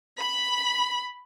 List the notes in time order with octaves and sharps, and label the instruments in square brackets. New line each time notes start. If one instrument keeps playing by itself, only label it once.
[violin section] B5